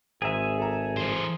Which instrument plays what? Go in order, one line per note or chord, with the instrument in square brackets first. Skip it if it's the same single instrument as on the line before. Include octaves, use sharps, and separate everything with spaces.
[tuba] G#1 [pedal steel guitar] G#4 E5 [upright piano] C5 A#5
[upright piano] A4 A#5
[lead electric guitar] E3 C5